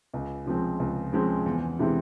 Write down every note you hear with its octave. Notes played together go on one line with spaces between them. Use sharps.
C#2
C#3 F3 G#3 C4
C#2
C#3 F3 G#3 C4
E2
C3 E3 G#3 C4